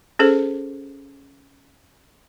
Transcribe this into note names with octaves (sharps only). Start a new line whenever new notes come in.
C#4 G#4 A4 C5